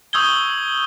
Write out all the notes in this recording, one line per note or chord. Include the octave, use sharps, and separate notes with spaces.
C#6 D#6 E6 G6 G#6 G7